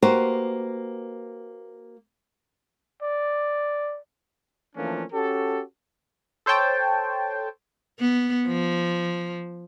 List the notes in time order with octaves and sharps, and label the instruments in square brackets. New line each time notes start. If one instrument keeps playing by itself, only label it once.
[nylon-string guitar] A#3 F#4 G4 B4 C5
[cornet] D5
[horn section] E3 F3 A3 A#3 C#4 D4
C#4 F#4 G4 A4
[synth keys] A4 C5 C#5 G5 A5
[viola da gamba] B3
F3